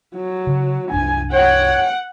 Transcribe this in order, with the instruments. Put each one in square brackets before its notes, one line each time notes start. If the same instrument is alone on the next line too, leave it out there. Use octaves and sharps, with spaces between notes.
[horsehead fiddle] F#3
[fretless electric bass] C#3
[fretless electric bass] C2 F#2 D4 [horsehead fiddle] G#5
[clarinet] C#5 [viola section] F#5 [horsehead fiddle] G5